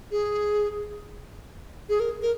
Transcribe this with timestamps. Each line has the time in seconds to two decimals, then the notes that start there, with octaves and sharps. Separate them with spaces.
0.11 G#4
1.89 G#4
2.00 A#4
2.22 A#4